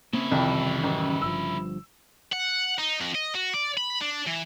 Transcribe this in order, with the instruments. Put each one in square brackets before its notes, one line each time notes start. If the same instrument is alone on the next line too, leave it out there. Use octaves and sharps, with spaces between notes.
[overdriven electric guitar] C#3 E4 [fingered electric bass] A#3 C4 C#4
[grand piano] C2 F2 [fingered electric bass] D#3 E3 G3
[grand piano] A1 F#2
[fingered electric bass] G1 G2 F3 [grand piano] E6
[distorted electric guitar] F#5
D#4
F2
D#5
F#4
D5
B5
D4
E3